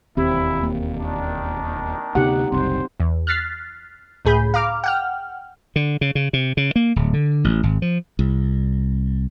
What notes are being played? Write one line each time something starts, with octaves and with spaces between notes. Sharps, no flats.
E1 D#2 A#2 C4 E4 G4
A#3
D#3 D4
D2 C3 B3 D#4 G4 F#5
F#1 C2 C4 C5
E2
F6 F#6 A6 B6 C7
C#2 A2 G#4 B5 G6
F5 A#5 D6 F6
F#5 G5 F6
D3
C#3
C#3
C3
C#3
A#3
D1
D3
A1
G#1
F3
C2